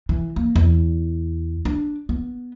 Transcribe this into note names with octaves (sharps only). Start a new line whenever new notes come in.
E3
A#3
E2
D4
B3